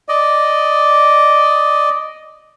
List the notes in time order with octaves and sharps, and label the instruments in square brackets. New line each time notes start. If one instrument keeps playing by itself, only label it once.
[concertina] D5 D#5